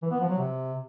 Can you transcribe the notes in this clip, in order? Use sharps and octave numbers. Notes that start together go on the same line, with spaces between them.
E3
B3
F3
F#3
C3